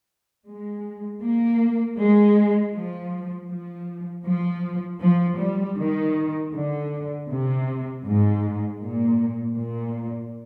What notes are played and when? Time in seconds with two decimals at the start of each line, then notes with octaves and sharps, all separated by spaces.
0.47 G#3
1.22 A#3
1.98 G#3
2.75 F3
3.50 F3
4.25 F3
5.01 F3
5.39 G3
5.78 D#3
6.53 D3
7.28 C3
8.05 G#2
8.80 A#2
9.56 A#2